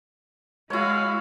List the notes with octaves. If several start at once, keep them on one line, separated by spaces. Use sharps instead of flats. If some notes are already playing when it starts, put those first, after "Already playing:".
G#3 E4 F#4 C#5 F5